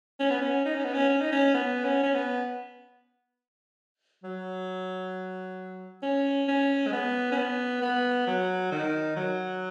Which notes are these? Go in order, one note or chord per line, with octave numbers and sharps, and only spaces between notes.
C#4
B3
C#4
D#4
C#4
B3
C#4
C#4
D#4
C#4
B3
C#4
C#4
B3
F#3
C#4
C#4
G#3
B3
C#4
B3
B3
F#3
D#3
F#3